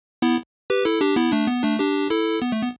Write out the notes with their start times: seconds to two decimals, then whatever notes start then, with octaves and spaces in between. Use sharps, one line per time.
0.22 B3 E4
0.70 G4 B4
0.85 E4 A4
1.01 D4 G4
1.16 B3 E4
1.32 A3 D4
1.48 B3
1.63 A3 D4
1.79 D4 G4
2.10 E4 A4
2.42 B3
2.52 A3
2.62 B3